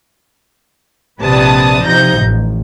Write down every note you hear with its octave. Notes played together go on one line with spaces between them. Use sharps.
A#1 C3 B4 D5 A5 D#6
C3 F3 D#4 G6 A#6
A1